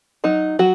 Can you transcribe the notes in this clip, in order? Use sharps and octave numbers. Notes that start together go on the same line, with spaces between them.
F#3 D#4
F#3 F#4